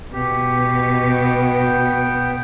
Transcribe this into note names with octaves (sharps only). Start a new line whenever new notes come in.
B2 G4
B3 G5